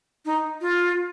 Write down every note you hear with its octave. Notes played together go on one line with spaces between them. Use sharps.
D#4
F4